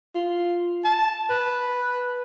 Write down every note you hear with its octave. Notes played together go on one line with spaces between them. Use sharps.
F4
A5
B4